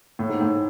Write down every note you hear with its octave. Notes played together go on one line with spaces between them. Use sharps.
A2
G#2
A2